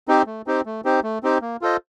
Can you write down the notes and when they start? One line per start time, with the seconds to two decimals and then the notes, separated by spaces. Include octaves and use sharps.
0.08 C4 D#4 G4 C5
0.26 A3
0.47 C4 D#4 G4 C5
0.66 A3
0.85 C4 D#4 G4 C5
1.03 A3
1.23 C4 D#4 G4 C5
1.41 A#3
1.62 F4 A4 C5 D#5